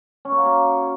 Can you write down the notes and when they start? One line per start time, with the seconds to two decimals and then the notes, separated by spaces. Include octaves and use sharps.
0.25 C#4
0.32 A#3
0.38 F#4
0.45 A#3